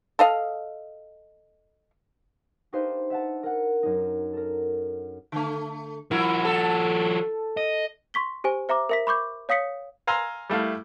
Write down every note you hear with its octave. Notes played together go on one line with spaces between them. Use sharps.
A4 D#5 F5
D4 D#4 G4 B4 C5 F5
E5 F#5 A5
A#4 F#5
F#2 D#4
A4 A#4
D3 A3
F3 E4 F#4 A#4
A4
D#5
C6 C#6 B6 G7
G4 C5 G#5
C5 E5 A#5 D6
A#4 E5 B6
B5 C#6 D6 G6
C#5 F5 D#6 B6 C#7
F5 G#5 A#5 C6 E6
G3 A3 E4 F5